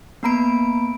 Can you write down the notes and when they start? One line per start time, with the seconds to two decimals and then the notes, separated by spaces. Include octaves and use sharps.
0.23 A#3 B3 A#5 B5 D7